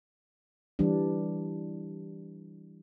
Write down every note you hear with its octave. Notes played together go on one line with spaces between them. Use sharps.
E3 G3 D4